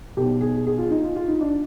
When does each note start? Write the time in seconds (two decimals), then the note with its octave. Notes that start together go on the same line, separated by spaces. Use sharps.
0.17 B1 B2 G4
0.41 G#4
0.67 G#4
0.78 F4
0.91 D#4
1.03 F4
1.16 F4
1.28 D#4
1.41 D4